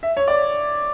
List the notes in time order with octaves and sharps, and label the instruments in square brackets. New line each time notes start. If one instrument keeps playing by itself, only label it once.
[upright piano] E5
C#5
D5